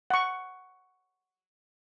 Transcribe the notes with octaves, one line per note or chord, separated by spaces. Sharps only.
F#5 C#6